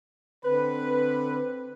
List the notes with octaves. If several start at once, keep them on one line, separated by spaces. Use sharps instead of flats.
D3 C4 B4